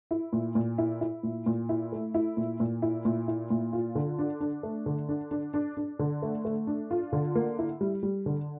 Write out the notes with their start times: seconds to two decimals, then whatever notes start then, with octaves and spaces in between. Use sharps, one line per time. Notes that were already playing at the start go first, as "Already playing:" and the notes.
0.11 E4
0.33 A#2
0.55 A#2
0.78 E4
1.01 E4
1.23 A#2
1.46 A#2
1.69 E4
1.92 A3
2.14 E4
2.37 A#2
2.60 A#2
2.82 E4
3.05 A#2
3.28 E4
3.50 A#2
3.73 F4
3.95 D3
4.19 D4
4.41 D4
4.63 A3
4.86 D3
5.09 D4
5.31 D4
5.54 D4
5.77 D4
5.99 D3
6.22 A3
6.45 A3
6.67 D4
6.91 F4
7.13 D3
7.35 A#3
7.59 E4
7.81 G3
8.03 G3
8.26 D3